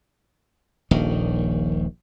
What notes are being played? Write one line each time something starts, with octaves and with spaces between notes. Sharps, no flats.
D#1 A#1 D#3